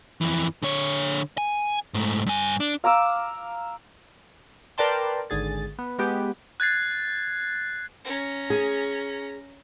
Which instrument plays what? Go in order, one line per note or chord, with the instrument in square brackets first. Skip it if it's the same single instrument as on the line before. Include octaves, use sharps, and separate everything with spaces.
[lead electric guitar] F2 E3
D3 C#5
G#5
G#2 A3
G2 G#5
D4
[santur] F5 A#5 D6 E6
[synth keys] A#4 B4 D5 G5 A5 C6
G#1 D3 G#4 A6
B3
G#3 B3 G4
[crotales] F#6 G#6 A6 C7
[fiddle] C#4 A#5
[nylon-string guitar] G#4